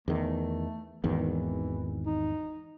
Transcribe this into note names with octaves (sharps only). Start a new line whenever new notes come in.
E2 D#3 A3
G#1 E2 D#3 E3
D#4